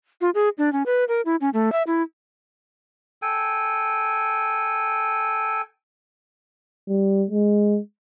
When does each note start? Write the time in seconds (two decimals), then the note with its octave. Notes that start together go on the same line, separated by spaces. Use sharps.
0.21 F4
0.35 G#4
0.58 D4
0.73 C#4
0.86 B4
1.08 A#4
1.25 E4
1.41 C#4
1.54 A3
1.72 E5
1.87 E4
3.22 A4 G5 G#5
6.88 G3
7.31 G#3